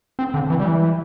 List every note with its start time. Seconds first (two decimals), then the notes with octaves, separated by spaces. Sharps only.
0.19 C4
0.34 D3
0.50 E3
0.60 G3
0.65 E3